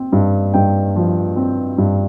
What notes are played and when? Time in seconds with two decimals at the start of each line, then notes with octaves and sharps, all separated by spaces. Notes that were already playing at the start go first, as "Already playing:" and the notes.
Already playing: C4
0.12 G2
0.54 G2 G5
0.96 F3
1.36 C4
1.78 G2